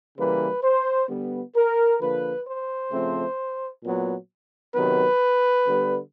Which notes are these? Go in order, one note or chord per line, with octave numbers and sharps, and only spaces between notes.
C#3 E3 G3 A#3 B4
C5
D3 G3 B3
A#4
D3 F3 A#3 B4
C5
C#3 F3 A3 C4
A#2 F#3 B3
C3 D#3 F#3 B3 B4
D3 G3 B3